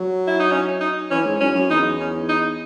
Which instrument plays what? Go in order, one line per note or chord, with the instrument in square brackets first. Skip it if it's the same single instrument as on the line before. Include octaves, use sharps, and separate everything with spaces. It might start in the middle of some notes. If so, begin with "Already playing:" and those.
Already playing: [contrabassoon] F#3
[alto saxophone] E4
D#4
C#4
D#4
[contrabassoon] E3 [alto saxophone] C#4
[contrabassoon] G#2
[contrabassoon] F#2 [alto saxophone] C#4
[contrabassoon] F#2
[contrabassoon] E2 [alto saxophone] D#4
[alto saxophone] C#4
D#4